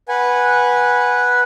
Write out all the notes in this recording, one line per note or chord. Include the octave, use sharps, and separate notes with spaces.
B4 F#5 G#5